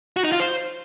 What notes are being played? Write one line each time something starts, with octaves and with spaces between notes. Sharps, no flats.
F#4
D#4
F4
C5